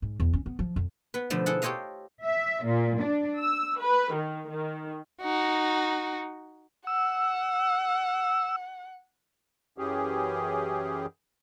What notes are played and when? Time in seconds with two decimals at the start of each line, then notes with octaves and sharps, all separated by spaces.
0.02 G#2
0.20 E2
0.33 C#4
0.46 B3
0.59 F3
0.76 F2
1.14 B3 B4
1.30 B2 D3 F3 A3
1.46 E4 G#4 A4 F#5
1.62 G4 A4 C5 C#5 D#5 F5
2.23 E5
2.65 A#2
3.00 D4
3.40 E6
3.80 B4
4.14 D#3
4.51 D#3
5.21 D#4 F#4
6.87 F#5 E6
9.78 F#2 E3 C#4 G4 G#4